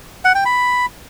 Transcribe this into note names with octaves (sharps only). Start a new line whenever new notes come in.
F#5
G5
B5